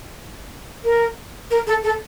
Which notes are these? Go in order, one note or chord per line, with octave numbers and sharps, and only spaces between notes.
A#4
A#4
A4
A4